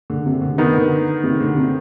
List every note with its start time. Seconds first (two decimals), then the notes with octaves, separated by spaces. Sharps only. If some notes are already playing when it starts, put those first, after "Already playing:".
0.10 D3
0.26 C3
0.42 D3
0.58 C3 D#3 B3 D#4
0.74 D3
1.23 C3 D#3
1.40 D3
1.57 C3